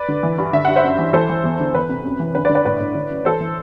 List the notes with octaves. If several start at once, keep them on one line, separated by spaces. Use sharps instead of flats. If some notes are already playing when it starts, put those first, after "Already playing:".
Already playing: B4 D5
D3
E3
G2
D3 E5
G2 F#5
C5 E5
F#2
E3
E3 A4 C5
E3
E2
D3
E2 B4
C3
F#2
E3
D3 B4
B4 D5
D3
B4 D5
A2 B4 D5
A2
D3
F#2
E3 A4 C5
E3